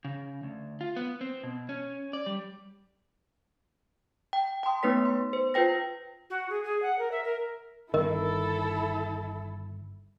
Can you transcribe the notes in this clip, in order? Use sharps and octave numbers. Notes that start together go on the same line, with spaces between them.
C#3
D2
F4
B3
C4
B2
C#4
D5
G3
G5
G5 A5 C6 D#6
A3 B3 D#4 B4 C#5 B6
B3 C6
C5
F4 B4 C5 G5 A#6
F#4
G#4
G#4
F#5
A#4
E5
A#4
G1 D#3 E4 A4 A#4 D#5